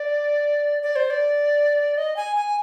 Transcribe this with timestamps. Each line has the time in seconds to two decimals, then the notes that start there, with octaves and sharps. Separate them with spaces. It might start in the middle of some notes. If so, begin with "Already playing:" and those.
Already playing: D5
0.82 D5
0.96 C5
1.10 D5
1.97 D#5
2.16 G#5
2.36 G#5